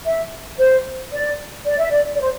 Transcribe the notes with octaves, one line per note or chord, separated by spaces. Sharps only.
E5
C5
D5
D5
E5
D5
D5
C5